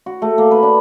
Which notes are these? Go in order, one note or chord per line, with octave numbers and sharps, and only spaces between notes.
F#4
A3
A#3
B4
D4